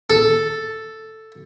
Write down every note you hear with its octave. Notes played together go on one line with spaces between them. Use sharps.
A4